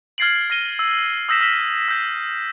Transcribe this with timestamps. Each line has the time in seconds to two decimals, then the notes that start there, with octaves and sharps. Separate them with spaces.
0.18 F6 G#6 A6 C7 D7 F#7
0.50 F6 A#6 D#7 G7
0.79 E6
1.29 D#6 E6 G6 A#6 B6 E7
1.41 F6 A#6 B6 E7 G7
1.88 E6 G6 B6